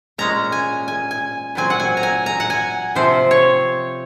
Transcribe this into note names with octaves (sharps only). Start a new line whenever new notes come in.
A#2 G#3 C#4 A#5
G#5
G#5
G#5
A#2 F#3 C4 G#5
F#5
G#5
A#5
G#5
A#5
F#5
G#5
C3 F3 C4 C5
C#5